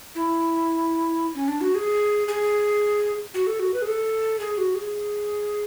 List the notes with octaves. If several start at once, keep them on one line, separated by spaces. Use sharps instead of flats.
E4
C#4
D4
F#4
G#4
G#4
F#4
A4
F#4
B4
G#4
A4
G#4
F#4
G#4